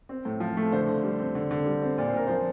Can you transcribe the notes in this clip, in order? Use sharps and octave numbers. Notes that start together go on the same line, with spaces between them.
C4
A2
F3
A3
D3 C5
D3
G3
C4
D3
D3
G3
C4
A#2 D5
C5
A#2 A#4
F3 C5